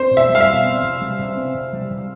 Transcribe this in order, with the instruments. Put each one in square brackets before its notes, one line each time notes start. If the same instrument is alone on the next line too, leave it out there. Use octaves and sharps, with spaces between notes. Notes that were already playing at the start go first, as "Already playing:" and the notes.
Already playing: [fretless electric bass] C4 [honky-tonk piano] C5
[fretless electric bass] B2
[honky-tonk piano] E5
[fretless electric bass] G3
[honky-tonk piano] F5
E5
[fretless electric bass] B2
C4
C3
G3
C3
C4
C3
G3
C3